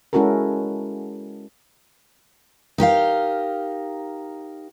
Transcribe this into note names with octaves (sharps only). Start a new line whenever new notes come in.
G#3 C#4 E4 F#4 A4 A#4
D#4 G4 A#4 F5